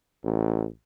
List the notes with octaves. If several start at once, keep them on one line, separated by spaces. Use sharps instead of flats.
A1